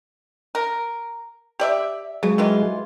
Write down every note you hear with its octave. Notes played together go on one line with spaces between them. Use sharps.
A#4
G4 D5 E5
C#3 F#3 G#3 G#4
D#3 E3 F4